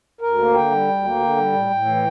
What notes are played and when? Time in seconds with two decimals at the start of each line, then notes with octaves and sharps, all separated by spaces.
0.21 D2 A#4
0.38 A#3
0.54 D3 G5
0.71 G3
0.88 D2
1.04 A#3
1.20 D3
1.37 G3
1.53 A2
1.70 A2
1.86 E3